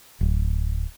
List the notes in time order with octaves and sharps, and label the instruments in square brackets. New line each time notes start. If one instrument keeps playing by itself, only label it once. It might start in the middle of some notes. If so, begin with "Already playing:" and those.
[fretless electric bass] D1